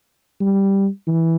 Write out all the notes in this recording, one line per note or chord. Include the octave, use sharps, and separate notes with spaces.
G3
E3